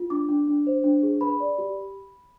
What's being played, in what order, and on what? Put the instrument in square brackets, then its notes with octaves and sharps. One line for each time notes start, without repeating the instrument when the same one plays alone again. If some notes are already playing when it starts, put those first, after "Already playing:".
Already playing: [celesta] F4
D4 D6
D4
D4
C5
D4
G#4
B4 B5
D5
G4